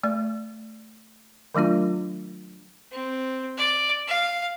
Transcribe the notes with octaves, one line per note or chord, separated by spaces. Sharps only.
A3 D5
D#3 F#3 A3 D4 F4
C4
D5
F5